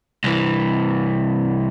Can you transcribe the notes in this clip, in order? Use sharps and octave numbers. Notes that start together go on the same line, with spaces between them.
C2 E3